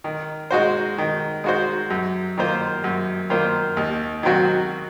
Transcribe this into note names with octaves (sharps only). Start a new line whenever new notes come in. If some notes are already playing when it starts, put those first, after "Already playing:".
D#3
G#3 D#4 F#4 C5
D#3
G#3 D#4 F#4 C5
F#2
D#3 A#3 F4 C5
F#2
D#3 A#3 F4 C5
D#2
D#3 F#3 C4 F#4